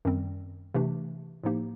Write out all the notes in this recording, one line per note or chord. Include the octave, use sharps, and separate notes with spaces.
F#2 D#3 G3 C4
C3 E3 A3 D4 G4
A2 F3 A#3 D#4 G4